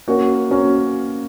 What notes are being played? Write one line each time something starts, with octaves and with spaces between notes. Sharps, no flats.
A#3 C#4 F#4 A#4 C#5
A#3 C#4 F#4 A#4 C#5